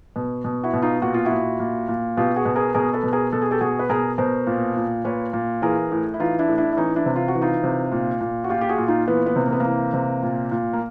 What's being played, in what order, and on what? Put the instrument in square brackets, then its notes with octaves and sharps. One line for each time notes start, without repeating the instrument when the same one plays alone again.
[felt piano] B2
B2
E4 F#4
B2
D#4 F4
A#2 F#4
F4
E4 F#4
A#2
A#2
A#2
B2 F4 G4
F#4 G#4
B2
G#4 A#4
B2 G#4 A#4
A4 B4
B2
G#4 A#4
B2 A4
G#4
G4 A4
B2 F#4 G#4
B4
B2 G#4 A#4
B2 A#4 C5
A#2
A#2
A#2 B4 C#5
A#2
E3 G#4 A#4
A2
E4
E3 D#4 F4
D4 E4
A2
D4 E4
E4
E3 C#4 D#4
D4 E4
C3
F4
F#4
E3
D#4 F4
C3
A#2
A#2
F#4
A#2 F4 G4
G4
F#4 G#4
A#2
D#4 F4
E3 B3
B3
C3
A#3
B3
A#3
E3
C3
A#2
A#2
A#3